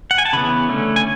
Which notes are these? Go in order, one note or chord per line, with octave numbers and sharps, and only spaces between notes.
F#5
G#5
A5
C#3 E3 B3 B5
D3 A3 C#4
G#5